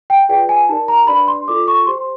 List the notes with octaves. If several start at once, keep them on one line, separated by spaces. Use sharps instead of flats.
G5
F4 G#4 B4 D5 G5
G#5
D#4 G4 A#4 D5 A5
A#5
D4 G4 B4 D5 B5
C6
F4 A4 D5 D6
C#6
G4 C5 C6